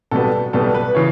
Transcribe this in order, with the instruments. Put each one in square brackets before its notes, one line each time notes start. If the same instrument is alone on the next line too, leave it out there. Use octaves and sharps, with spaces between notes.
[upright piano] B1 B2 G3 B3 A4
B1 B2 G3 B3 A4
B4
C#3 E3 C#5